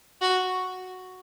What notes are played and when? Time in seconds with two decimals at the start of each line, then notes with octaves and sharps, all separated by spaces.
0.21 F#4